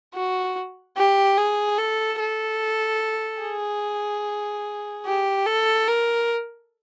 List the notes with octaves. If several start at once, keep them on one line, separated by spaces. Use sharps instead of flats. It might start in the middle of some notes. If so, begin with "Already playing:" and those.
F#4
G4
G#4
A4
A4
G#4
G4
A4
A#4